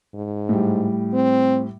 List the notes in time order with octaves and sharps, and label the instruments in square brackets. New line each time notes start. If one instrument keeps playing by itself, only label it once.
[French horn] G#2
[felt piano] A2 G3
[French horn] C4